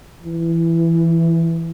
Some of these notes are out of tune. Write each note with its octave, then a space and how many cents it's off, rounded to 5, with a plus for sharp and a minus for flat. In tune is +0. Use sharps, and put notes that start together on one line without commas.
E3 +10